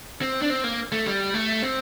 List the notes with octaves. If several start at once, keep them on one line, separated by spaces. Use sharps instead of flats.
C4
D4
C4
A#3
A3
G3
A3
C4